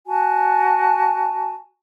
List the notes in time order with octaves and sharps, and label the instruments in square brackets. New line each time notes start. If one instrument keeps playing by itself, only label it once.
[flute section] F#4 G#5 A5